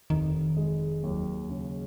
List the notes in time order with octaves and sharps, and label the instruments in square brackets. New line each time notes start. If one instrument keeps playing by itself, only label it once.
[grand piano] F1 [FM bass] D#3
[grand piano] G#3
[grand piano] D#2 [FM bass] F#3
[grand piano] C#3